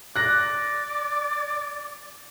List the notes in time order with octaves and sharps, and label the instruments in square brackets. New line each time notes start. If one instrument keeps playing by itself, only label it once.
[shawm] D5 [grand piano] F#6 A#6